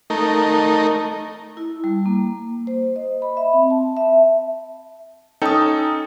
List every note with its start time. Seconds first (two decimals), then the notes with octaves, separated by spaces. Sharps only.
0.10 A3 D#4 A#4
1.57 E4
1.84 G3
2.06 A#3
2.67 C5
2.96 D#5
3.22 B5
3.37 E5
3.53 C4
3.70 A5
3.97 E5
5.42 C#4 D#4 A4 G5 D#6